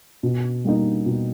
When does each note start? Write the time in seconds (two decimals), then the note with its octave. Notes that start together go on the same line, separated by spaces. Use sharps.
0.23 B2
0.65 G3 A#3 D#4
1.06 B2